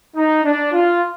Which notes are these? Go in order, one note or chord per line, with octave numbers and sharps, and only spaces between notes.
D#4
D4
F4